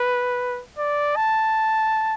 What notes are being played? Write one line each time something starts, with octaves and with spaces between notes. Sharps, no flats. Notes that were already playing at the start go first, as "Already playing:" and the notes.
Already playing: B4
D5
A5